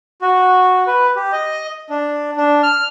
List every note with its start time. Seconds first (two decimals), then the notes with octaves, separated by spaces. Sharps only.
0.22 F#4
0.87 B4
1.16 G4
1.32 D#5
1.90 D4
2.37 D4
2.63 F6